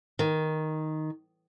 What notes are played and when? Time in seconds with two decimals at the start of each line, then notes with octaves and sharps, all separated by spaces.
0.19 D#3